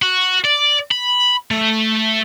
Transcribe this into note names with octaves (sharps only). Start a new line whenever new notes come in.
F#4
D5
B5
A3